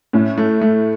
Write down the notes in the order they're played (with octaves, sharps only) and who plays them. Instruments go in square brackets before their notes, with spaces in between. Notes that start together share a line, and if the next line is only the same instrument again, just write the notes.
[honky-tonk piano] A2 [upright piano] C#4
[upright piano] A3
A3